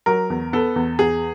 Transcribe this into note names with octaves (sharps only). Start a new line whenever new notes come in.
F#3 A#4
E2
B3 A4
E2
E2 G#4